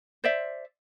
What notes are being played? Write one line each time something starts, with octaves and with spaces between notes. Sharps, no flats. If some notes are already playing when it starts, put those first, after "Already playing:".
C5 D5 E5